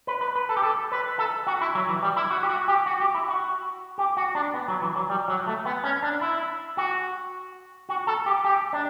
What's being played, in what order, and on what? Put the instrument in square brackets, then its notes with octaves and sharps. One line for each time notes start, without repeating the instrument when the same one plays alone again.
[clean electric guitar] B4
B4
B4
A4
G4
A4
B4
A4
F#4
E4
F#3
E3
G3
E4
F#4
G4
F#4
G4
F#4
G4
E4
F#4
G4
F#4
D4
B3
F#3
E3
F#3
G3
F#3
A3
B3
C#4
D4
E4
F#4
F#4
A4
G4
G4
D4